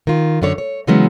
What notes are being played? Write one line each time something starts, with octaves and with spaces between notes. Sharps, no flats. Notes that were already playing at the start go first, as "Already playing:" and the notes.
D#3 F4
F#2 D3 C#5
C#5
C#3 E3 F#3 G#3 B3 C#4